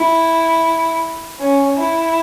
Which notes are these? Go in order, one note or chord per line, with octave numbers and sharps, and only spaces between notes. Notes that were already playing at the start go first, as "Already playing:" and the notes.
Already playing: E4
C#4
E4